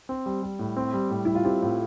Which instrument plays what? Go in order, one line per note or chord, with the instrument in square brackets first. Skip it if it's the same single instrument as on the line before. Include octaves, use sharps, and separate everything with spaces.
[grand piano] C4
G3
G3
A2
C4
G3
A2
[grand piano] G3 [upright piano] E4
[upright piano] F4
[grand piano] C4 [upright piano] E4 G4
[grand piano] A2 [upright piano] F4